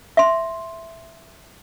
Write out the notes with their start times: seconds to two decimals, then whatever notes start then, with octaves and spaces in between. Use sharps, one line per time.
0.17 E5 C6